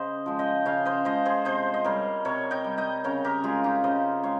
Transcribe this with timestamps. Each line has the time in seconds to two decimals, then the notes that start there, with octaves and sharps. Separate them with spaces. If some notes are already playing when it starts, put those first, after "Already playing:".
Already playing: C#3 C5 D#5
0.26 F3 G#3
0.39 D#5 G5
0.65 C#3 C#5 F5
0.85 C5 D#5
1.05 F3 G#3 C5 D#5
1.25 G#4 C5
1.45 C3 C5 D#5
1.74 D#5
1.85 G3 A#4 C#5
2.25 C3 A#4 C#5
2.51 D#5 G5
2.64 G3
2.78 D#5 G5
3.04 C#3 A#4 C#5
3.25 G4 A#4
3.43 G#3 F4 G#4
3.64 D#4 G4
3.84 C#3 C5 D#5
4.23 G#3 C#5 F5